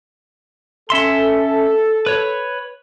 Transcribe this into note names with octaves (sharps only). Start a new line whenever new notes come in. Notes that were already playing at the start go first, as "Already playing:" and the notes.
C#4 A4 E5 C6
B4 C#5